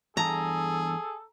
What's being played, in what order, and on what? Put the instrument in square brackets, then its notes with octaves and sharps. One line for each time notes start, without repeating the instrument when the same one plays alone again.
[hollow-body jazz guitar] E2 G2 A5 [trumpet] G#4 [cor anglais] A4 [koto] A#5